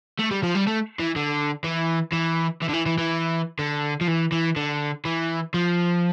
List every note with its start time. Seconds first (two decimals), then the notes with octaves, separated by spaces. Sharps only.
0.19 A3
0.31 G3
0.43 F3
0.55 G3
0.67 A3
1.00 E3
1.16 D3
1.64 E3
2.13 E3
2.62 E3
2.69 D3
2.74 E3
2.86 E3
2.98 E3
3.59 D3
4.01 F3
4.08 E3
4.32 E3
4.56 D3
5.05 E3
5.54 F3